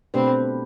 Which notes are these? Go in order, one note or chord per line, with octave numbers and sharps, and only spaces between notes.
B2 A3 C4 D4 G4 B4